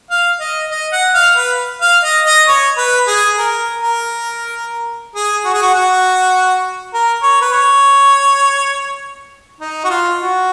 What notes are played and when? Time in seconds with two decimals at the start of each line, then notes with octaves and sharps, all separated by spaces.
0.11 F5
0.40 D#5
0.71 D#5
0.92 F#5
1.15 F5
1.37 B4
1.82 F5
2.04 D#5
2.26 D#5
2.48 C#5
2.78 B4
3.08 G#4
3.38 A#4
3.82 A#4
5.15 G#4
5.45 F#4
5.54 G#4
5.62 F#4
5.74 F#4
6.94 A#4
7.23 C#5
7.42 B4
7.53 C#5
9.61 D#4
9.85 F#4
9.90 F4
10.20 F#4